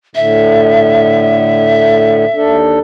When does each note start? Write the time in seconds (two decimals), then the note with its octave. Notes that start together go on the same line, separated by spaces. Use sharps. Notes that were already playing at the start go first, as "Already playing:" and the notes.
0.15 A2 D3 E5
2.34 D#2 D4 A4